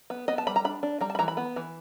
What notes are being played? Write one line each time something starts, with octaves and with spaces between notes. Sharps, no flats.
B3
B3 D#5
A5
G3 B5
A#5
D4 B5
D4
G3 A#5
A5
B5
E3 A#5
B5
B3
E3